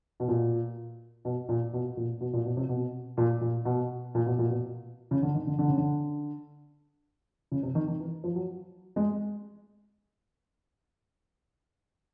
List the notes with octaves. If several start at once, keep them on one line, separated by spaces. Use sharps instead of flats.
B2
A#2
B2
A#2
B2
A#2
B2
A#2
B2
C3
B2
A#2
A#2
B2
A#2
B2
A#2
B2
C#3
D3
D#3
D3
D3
C#3
D3
C#3
C3
D#3
D#3
E3
F3
F#3
G#3